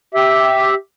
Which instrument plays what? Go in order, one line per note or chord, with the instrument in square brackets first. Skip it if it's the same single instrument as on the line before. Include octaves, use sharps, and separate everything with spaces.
[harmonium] G4 E5